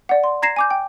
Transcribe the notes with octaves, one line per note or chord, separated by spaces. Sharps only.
D5 F#5
C6
A#5 G#6 A#6 C7 E7
G#5 D6 G6
G5